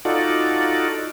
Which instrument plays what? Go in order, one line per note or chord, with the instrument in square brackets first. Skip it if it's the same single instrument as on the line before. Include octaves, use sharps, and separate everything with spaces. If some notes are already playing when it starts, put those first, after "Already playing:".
[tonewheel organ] D#4 F4 F#4 A4 D5